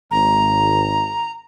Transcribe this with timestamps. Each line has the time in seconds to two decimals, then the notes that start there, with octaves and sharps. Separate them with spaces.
0.11 G#1 A#5